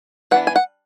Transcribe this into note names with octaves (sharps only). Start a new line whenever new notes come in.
E3 B3 D4 F#5
G#5
F#5